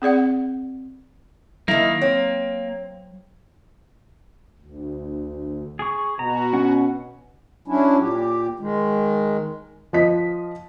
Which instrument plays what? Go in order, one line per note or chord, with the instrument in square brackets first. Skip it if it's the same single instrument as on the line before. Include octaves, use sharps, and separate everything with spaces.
[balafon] C4 G#4 D5 F#5
[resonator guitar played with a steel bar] D#3 E4 [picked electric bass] F#3 [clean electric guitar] A#3
[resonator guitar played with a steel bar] C4 [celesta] C#5
[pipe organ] D2
[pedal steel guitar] G#4 C#6
[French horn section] B2 [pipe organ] F#4 [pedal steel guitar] A#5
[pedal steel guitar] C#4 F#5
[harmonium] F#3 C#4 D4 E4
A#2 G4
D#3 G#3
[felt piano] F3 C5 D#5 B6